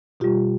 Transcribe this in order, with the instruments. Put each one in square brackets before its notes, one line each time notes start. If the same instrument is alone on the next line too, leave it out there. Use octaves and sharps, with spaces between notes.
[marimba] B2 G3 F4 G4